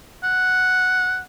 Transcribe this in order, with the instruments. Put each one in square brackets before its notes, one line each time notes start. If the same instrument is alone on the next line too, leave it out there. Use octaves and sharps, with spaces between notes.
[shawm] F#5